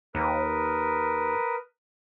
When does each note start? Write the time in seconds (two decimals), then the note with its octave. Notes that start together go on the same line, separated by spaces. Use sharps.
0.15 D#2 A#4 B4 D#6